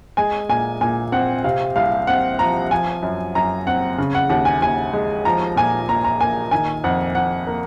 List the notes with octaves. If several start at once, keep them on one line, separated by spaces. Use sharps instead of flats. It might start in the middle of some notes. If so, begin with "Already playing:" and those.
G#3 G#5
A#2 G#5
A#2 G#5
C4 F#5
C3 F5
C2 F5
C4 F#5
F3 A#5
F3 G#5
F#2
F#2 A#5
C4 F#5
C#3
F#5
D#2 F#5
G#5
D#2 G#5
G#3
F3 A#5
A#2 G#5
A#2 A#5
A#5
A#3 G#5
D#3 G#5
F2 F#5
F2 F#5
A#3